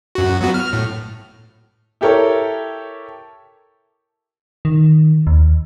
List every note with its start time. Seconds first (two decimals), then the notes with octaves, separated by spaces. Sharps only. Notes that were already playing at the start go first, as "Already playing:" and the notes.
0.15 F#2 F#4
0.41 F#3 B3 F#4
0.54 F6
0.73 A2
2.01 E4 G4 A4 A#4 C#5
4.65 D#3
5.27 D#2